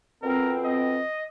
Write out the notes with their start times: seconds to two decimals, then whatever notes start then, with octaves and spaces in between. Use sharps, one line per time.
0.23 F2 B2 C4 A#4
0.65 D#5